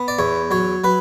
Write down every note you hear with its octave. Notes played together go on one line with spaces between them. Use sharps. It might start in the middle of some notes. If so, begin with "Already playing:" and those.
Already playing: B3
D5
E2 C#5
F#3 C#5
F#3 B4